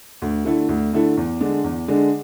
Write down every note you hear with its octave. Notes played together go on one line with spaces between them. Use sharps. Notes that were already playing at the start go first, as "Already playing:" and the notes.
D2
D3 A3 E4 A4
D2
D3 A3 E4 A4
E2
D3 G#3 D4
E2
D3 G#3 D4